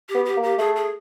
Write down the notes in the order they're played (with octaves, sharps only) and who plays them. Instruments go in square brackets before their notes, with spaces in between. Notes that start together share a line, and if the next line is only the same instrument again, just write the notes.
[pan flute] G4
[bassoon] B3
[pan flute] G4
[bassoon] A#3
[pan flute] G4
[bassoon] A3 [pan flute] G#4
[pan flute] G#4